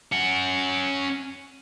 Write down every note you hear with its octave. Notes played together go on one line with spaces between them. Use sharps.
C#4 F#5